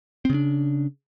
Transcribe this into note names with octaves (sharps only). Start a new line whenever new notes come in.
C#3 C4 D4